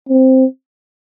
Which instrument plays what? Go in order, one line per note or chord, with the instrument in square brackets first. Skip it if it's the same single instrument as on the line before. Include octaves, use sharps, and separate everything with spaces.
[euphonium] C4